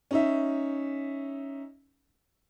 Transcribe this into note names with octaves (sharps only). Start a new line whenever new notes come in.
C#4 D#4 E5